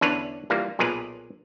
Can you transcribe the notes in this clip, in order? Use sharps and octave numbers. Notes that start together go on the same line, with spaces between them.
E2 D3 C#4 D4 B4 C#5
E3 G3 A#3 F4
B1 A#2 G#4 A#4 B4